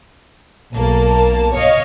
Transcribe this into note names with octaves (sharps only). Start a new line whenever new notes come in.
B1 A#3 A5
C#5 D#5 F5